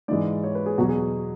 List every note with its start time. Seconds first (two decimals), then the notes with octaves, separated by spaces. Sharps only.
0.08 G#2 E3 G#3 D5
0.43 C#5
0.55 B4
0.66 G#4
0.78 E2 B2 F#3 F#4
0.89 G#4